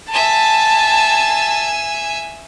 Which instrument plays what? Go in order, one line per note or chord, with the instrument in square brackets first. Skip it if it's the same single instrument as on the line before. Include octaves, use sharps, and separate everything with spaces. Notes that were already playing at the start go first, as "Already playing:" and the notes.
[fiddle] E5 G#5 [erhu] A5